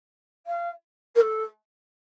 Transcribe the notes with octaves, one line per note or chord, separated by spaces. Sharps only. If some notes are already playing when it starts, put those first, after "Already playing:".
F5
A#4
A4